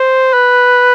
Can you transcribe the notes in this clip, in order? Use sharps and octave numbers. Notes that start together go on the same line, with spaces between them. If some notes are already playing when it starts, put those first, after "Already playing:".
Already playing: C5
B4